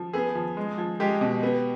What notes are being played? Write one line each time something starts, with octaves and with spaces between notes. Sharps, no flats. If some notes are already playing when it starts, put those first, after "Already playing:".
Already playing: F3
B3 G#4
F3
G#3
F3
G#3 G4
B2
B3